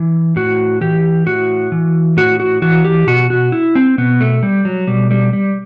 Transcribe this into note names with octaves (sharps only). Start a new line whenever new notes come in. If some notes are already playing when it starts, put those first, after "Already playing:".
Already playing: E3 E4
A2 F#4
E3 G4
A2 F#4
E3
A2 F#4
F#4
E3 F#4
G4
B2 F#4
F#4
E4
C4
B2 B3
A3
G3
F#3
B2 G3
G3
G3